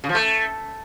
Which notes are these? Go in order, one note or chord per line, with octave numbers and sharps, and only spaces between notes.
C#3
F3
A3